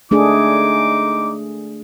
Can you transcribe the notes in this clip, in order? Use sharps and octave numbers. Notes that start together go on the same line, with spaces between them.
A3 D4 D#4 G#4 D6